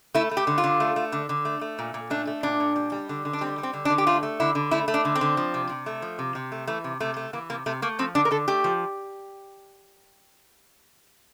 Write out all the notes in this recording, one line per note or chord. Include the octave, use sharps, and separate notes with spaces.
A3 E4
A3
G4
D3
F4
D3
A3
A3
D3
D3
A3
A3
A#2
A#2
A3 D4
A3
A#2 D4
A#2
G3
G3
D3
D3
D4
G3 C4
G3
C4
D3
D4
D3
G4
A3 F4
A3
D3 E4
D3
A3 E4
A3
D4
D3
C4
D3
F3
C3
C3
A3
F3
C3
C3
A3
E3 A3
C3
C3 A3
A3
E3 A#3
C3 A#3
C3 A3
A3 A#3
F3 C4
D3 D4
A#4
D3 A4
A3 G4
F3